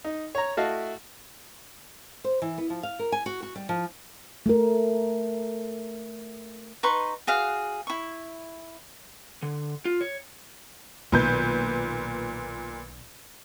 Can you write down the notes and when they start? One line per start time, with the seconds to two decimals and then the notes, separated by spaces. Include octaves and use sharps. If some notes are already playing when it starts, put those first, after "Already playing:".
0.05 D#4
0.35 C#5 A#5
0.57 A3 E4 F#4 D#5 F5 A5
2.24 C5
2.42 E3
2.58 B3
2.70 F3
2.83 F5
2.99 A#4
3.12 G#5
3.26 F#4
3.43 F#4
3.56 G3
3.69 F3
4.46 A3 A#4
6.83 D#4 B4 C6 C#6
7.27 F#4 G#4 F5
7.87 E4 C#6
9.42 D3
9.85 F4
10.01 C#5
11.12 B1 A#2 D#3 B4 G6